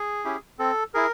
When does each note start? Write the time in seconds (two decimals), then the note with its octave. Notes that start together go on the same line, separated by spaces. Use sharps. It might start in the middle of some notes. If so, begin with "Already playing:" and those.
Already playing: G#4
0.24 C#4 E4 G4
0.59 C4 A4
0.94 E4 G#4 A#4